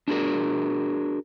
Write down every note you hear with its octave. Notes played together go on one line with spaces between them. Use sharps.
D4 F#4 G#4 A#4